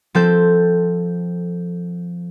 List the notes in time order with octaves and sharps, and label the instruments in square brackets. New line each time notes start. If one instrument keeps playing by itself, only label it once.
[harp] F3 C4 A4 G6